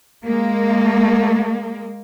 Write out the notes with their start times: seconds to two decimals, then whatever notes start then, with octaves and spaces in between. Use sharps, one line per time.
0.24 G#3 A#3